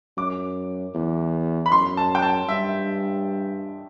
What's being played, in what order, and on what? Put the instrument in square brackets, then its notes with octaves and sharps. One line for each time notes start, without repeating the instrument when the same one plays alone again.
[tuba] F#2 [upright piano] D6
[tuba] E2
[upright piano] B5
[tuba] F#2 [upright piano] C6
[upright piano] A5
G5
A5
[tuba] G2 [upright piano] E5